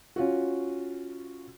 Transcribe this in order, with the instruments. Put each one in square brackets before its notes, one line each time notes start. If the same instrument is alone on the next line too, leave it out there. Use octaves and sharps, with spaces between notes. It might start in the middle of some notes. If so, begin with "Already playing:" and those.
[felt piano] C#4 F4 F#4